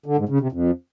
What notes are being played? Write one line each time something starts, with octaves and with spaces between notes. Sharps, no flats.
D3
G#2
C#3
C3
F2